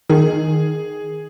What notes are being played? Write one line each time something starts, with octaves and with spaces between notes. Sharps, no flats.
D#3 G#4